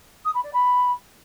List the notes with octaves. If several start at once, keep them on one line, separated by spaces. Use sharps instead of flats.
D#6
B5
D5
B5